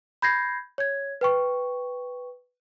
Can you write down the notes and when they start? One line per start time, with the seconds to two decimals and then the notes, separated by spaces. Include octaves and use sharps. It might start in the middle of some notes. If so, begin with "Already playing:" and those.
0.22 B5 G6 G#6 A#6 C7
0.78 C#5 G#6
1.21 B4 G5 C#6